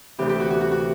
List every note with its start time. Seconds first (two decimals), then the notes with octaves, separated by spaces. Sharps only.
0.19 D2 C3 E3 G4
0.29 G4
0.40 F#4
0.50 F#4
0.61 F#4
0.71 F#4